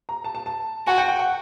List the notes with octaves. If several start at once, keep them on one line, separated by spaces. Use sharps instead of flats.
A#5
A5
A5
A5
F#4 G#5
G5
G5
F#5